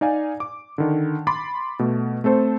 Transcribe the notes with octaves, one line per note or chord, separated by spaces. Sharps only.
D#4 D5 F5 G#5
D6
D3 D#3
B5 C6 D6 A6
B2 A3
A3 C4 A4 C5